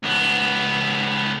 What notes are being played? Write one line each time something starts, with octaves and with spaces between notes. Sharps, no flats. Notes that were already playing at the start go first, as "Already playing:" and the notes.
C#2 B3